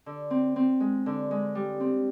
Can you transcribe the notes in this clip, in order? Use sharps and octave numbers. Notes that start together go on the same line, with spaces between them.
D3
C4
C4
G#3
D3
G#3
G3
C4